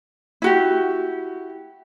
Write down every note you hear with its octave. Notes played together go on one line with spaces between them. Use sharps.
E4 F#4 G4